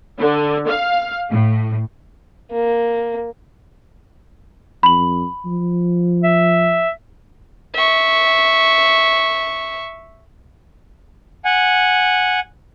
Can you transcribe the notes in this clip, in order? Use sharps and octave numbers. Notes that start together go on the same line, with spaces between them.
D3
F5
A2
A#3
F2 B5 F#7
F3
E5
E5 C#6
F#5 G#5